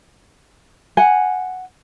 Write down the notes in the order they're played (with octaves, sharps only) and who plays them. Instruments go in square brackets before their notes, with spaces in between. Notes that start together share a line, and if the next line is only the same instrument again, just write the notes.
[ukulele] F#5 G#5